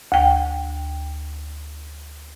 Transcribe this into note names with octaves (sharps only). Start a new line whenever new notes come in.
D2 G5